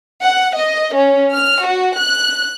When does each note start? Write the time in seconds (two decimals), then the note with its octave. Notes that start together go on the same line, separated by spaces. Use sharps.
0.23 F#5
0.57 D#5
0.95 C#4
1.33 F6
1.64 F#4
1.96 F#6